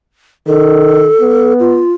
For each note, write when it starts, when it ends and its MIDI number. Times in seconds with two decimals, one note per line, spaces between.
0.47 1.09 51
0.47 1.53 69
1.21 1.82 59
1.60 1.92 65